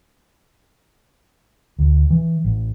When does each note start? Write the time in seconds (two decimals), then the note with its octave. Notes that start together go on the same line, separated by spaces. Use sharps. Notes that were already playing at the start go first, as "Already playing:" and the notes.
1.79 D2
2.10 E3
2.44 A1